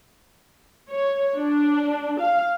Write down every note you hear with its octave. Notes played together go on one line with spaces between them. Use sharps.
C#5
D4
F5